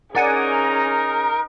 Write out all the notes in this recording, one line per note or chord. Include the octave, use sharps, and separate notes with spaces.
C#4 D#4 G#4 A#4 D5 F#5 G#5